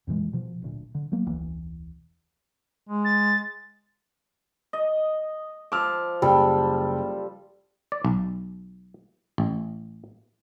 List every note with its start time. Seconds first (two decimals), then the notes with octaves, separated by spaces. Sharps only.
0.07 F2 A#2 E3 G#3
0.33 B2 F3
0.62 D1 D2 A#2
0.95 D3
1.12 F#3 A#3 B3
1.27 E1 C#2 E3
2.89 G#3
3.05 A6
4.73 D#5
5.72 F3 D6 E6 F6
6.22 F#1 G3 A4 G5
7.92 D5
8.05 B1
9.38 A1